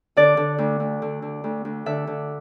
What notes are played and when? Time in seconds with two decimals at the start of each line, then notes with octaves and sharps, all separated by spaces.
0.17 D3 D5
0.37 D3
0.58 D2
0.80 D2
1.02 D3
1.22 D3
1.44 D2
1.65 D2
1.86 D3 E5
2.07 D3